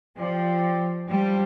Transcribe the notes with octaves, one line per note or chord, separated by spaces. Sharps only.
F3 C4 G4 D5 G5
G3 D4 F4 C5 G5